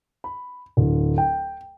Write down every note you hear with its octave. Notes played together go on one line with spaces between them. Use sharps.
B5
D1
G5